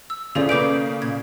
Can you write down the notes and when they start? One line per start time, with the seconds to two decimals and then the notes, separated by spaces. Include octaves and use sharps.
0.10 E6
0.35 C#3 E3 F3 A#3 G#4 A4 D5
0.49 A#3 B4 D5 D6 G6 D7
1.02 A#2 G#6